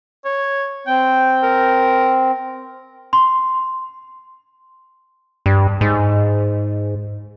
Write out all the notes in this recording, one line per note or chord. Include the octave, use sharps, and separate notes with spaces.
C#5
C4 G5
A#4
C6
G2
G#2